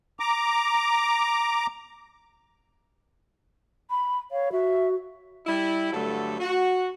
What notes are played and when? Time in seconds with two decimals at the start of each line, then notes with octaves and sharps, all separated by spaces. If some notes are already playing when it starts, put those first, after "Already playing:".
0.20 A#5 D6
3.90 B5
4.31 C#5 F5
4.52 F#4 E5
5.47 G3 E4
5.93 G2 D3 F#3 A3 A4
6.40 F#4